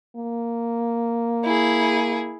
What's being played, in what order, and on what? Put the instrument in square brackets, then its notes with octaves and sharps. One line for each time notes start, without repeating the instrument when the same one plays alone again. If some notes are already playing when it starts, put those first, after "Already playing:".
[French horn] A#3
[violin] E4 G#4